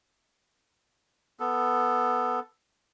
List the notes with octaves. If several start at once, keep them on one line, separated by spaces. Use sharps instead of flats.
B3 A4